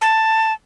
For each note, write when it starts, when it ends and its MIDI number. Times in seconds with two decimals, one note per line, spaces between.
0.01 0.53 81